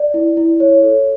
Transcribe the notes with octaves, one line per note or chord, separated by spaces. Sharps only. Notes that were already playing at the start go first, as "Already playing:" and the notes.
Already playing: D5
E4
E4
C#5
A4